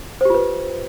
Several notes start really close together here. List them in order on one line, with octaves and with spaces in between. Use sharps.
C5 G4 F4 B4